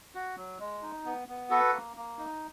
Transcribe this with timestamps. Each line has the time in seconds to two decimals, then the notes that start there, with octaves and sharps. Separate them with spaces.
0.15 F#4
0.37 F#3
0.60 G#3
0.82 D#4
1.05 B3
1.28 B3
1.50 F#4 A4 B4
1.73 A#3
1.97 A#3
2.19 D#4